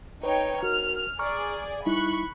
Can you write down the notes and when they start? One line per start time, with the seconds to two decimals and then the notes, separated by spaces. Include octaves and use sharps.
0.23 D#4 B4 C#5 G5
0.63 F#4 A#4 F6
1.19 G#4 D5 A#5 C#6 F6
1.86 G3 D#4 E4 B5 C#6 F#6